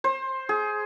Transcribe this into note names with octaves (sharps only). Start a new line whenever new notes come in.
C5
G#4